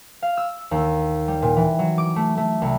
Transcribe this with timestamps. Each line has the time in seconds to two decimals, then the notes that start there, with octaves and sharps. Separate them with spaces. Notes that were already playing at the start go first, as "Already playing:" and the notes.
0.22 F5
0.37 E6
0.71 D#2
1.28 G3
1.42 A#2
1.56 E3
1.79 F#3
1.98 D6
2.16 A3
2.37 A3
2.62 C2